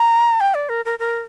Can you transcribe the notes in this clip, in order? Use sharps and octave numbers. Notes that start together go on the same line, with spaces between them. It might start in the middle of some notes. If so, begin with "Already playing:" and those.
Already playing: A#5
G5
D5
A#4
A#4
A#4